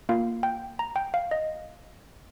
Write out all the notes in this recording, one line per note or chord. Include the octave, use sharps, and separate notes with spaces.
A#3 F4 F5
G5
A#5
G5
F5
D#5